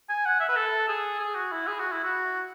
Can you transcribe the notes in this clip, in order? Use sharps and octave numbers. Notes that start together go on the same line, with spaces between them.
G#5
F#5
E5
B4
A4
G#4
G#4
F#4
E4
G#4
F#4
E4
F#4